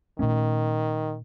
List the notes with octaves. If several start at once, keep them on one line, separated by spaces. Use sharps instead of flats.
A#2 D#3 A3 C#4